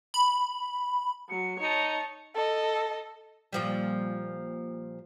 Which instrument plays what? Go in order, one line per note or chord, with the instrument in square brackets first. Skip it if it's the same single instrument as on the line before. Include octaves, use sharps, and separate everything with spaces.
[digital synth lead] B5
[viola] F#3 [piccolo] C#7
[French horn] D#4 [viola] C#5 A5 [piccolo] C#7
[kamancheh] A4 D#5
[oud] A#2 F3 G3